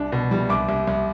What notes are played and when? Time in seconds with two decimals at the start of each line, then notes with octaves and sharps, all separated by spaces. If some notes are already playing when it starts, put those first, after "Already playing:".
Already playing: C2 D4
0.12 B2
0.31 G3
0.49 C2 D6
0.69 C2
0.87 C2